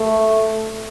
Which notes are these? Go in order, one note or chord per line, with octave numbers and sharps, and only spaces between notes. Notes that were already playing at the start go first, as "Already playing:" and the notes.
Already playing: A3